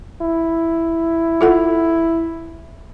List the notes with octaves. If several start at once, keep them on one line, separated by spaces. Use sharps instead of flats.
E4
F4 A4 F#5